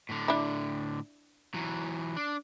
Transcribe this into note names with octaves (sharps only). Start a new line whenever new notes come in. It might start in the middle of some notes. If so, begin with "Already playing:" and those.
A2 D3
D4 E4
E3 F#3
D4